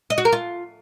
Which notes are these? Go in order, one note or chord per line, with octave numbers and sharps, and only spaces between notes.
D#5
F#4
A#4
F4